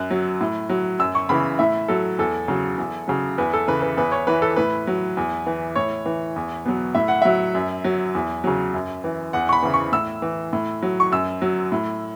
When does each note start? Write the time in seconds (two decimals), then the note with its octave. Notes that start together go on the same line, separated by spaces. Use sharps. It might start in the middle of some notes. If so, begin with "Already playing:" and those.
Already playing: F#2 F#6
0.11 F#3
0.41 A2
0.70 F#3
0.99 F#2 E6
1.15 C#6
1.29 C#3 E3 B5
1.59 A2 E5
1.88 F#3 A4
2.19 E2 A4
2.48 C#3 F#3
2.78 E2
3.08 C#3 F#3
3.38 E2 B4
3.53 A4
3.68 C#3 E3 B4
3.82 B4
3.97 E2 B4
4.12 C#5
4.27 E3 B4
4.42 A4
4.56 A2 B4
4.87 F#3
5.17 E2
5.46 E3
5.75 A2 C#5
6.06 E3
6.36 E2
6.65 B2 F#3
6.95 A2 E5
7.08 F#5
7.22 F#3 E5
7.55 F#2
7.84 F#3
8.15 E2
8.44 C#3 F#3
8.74 F#2
9.04 E3
9.33 E2 F#5
9.49 C#6
9.53 B5
9.63 C#3 E3
9.74 C#6
9.92 A2 E6
10.22 E3
10.53 A2
10.83 F#3
11.00 C#6
11.12 F#2 E6
11.42 F#3
11.72 A2